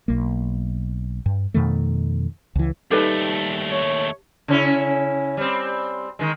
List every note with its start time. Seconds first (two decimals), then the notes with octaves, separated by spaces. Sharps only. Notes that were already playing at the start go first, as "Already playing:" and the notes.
0.08 B1 A#3
1.26 G2
1.54 F2 B2 D#3 A3
2.55 C#2 E3
2.91 D#2 G3 A3 D#4 G4 A4 B4
3.71 C#5
4.48 C#3 C#4 E4
5.37 G3 C4
6.19 D#3 G#3